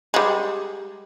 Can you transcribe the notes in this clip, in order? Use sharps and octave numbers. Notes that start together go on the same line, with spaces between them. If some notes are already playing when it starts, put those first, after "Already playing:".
G3 G#3